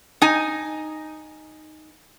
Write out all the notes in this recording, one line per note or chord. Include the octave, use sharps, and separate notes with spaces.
D#4 G#5